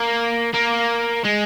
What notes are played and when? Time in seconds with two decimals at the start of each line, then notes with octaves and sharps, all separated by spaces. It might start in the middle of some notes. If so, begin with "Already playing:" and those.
Already playing: A#3
0.54 A#3
1.25 G#3